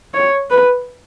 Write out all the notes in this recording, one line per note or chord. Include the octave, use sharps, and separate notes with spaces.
C#5
B4